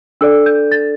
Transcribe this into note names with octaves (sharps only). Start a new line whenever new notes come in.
D4 A4 D5 E6
G6
A6